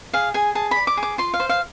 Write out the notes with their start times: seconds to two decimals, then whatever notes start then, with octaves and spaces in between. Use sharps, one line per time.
0.13 G#4 F5
0.34 G#4 G#5
0.55 G#4 A5
0.71 D5 B5
0.87 D6
0.97 G#4
1.03 D6
1.18 F4 C6
1.34 F5
1.40 C5
1.49 F5